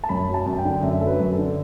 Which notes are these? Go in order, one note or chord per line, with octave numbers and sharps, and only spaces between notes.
A5
F#2 B5
F#3
A5
F#2
A5
G5
D3
F#2 E5
F#3 A4
B4
F#2
A4
D3